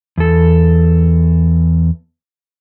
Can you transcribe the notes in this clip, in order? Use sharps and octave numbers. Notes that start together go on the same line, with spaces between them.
E2 A4